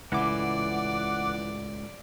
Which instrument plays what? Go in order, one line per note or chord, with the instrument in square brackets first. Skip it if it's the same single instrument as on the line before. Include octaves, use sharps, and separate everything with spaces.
[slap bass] C#2 A2 [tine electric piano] E3 E4 [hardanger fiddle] D5 [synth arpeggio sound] F#5 D6